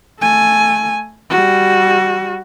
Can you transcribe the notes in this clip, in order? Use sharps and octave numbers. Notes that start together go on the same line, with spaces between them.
A3 G#5
G3 F#4